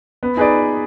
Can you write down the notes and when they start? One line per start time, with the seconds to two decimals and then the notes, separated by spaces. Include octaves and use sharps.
0.23 B3
0.37 D#4 G#4 B4 D5